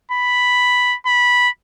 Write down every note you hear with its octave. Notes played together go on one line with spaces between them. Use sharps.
B5
B5